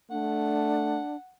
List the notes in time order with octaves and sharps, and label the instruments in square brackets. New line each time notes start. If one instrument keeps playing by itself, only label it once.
[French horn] A3 [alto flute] D4 [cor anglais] F#5